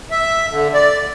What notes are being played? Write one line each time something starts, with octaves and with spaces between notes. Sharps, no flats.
E5
D3
D5